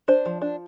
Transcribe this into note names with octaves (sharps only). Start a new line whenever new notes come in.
D4 C5
F3
D4